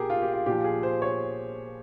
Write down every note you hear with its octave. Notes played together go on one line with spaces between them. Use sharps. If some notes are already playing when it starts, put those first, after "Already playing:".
Already playing: A#2 G4 G#4 A#4
F4
G4
F4
A#2 F3 G4
G#4
C5
C#5